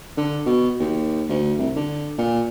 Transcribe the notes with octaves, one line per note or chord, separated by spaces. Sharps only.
D3
B2
D#2
D2
C2
D3
A#2